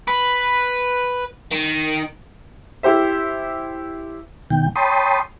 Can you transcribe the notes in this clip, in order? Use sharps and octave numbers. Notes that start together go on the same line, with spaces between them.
B4
D#3
E4 G4 C5 E5
B2 D#3 G5
C#5 G5 A5 B5 C6 D#6